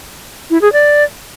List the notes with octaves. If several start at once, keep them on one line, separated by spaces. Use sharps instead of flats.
E4
G#4
D5